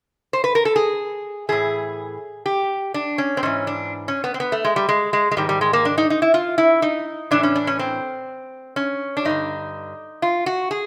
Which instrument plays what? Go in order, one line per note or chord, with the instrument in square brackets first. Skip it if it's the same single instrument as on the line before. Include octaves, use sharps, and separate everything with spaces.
[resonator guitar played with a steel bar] C5
B4
A#4
A4
G#4
A2 E3 G#4
G4
D4
C#4
C4
G#2 E3 C#4
D4
C#4
B3
C4
B3
A3
G#3
G3
G#3
G#3
G#3
G#2 D#3 G3
G3
G#3
A#3
D4
D#4
D#4
E4
F4
E4
D#4
A2 E3 D4
C#4
D4
C#4
C4
C#4
D4
G2 D3 D#4
F4
F#4
G#4